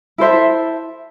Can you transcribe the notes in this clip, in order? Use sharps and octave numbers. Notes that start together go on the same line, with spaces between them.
E4 A4 C5 E5